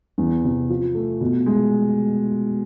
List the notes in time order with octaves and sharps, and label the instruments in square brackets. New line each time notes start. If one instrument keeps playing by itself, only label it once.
[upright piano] E2
C3
F3
A3
B2
G#3